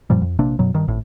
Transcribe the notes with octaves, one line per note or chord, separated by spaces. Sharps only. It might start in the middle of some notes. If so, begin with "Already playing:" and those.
F#2 A#2 F3 G3
F2
A#1 C3 A#3 D4
F#2 B2 F#3
G2 D#3
G#1 A2